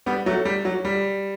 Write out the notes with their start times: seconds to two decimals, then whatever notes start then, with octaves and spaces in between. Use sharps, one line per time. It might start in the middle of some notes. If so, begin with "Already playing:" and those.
0.06 G3 B3
0.26 F#3 A3
0.45 G3
0.65 F#3
0.85 G3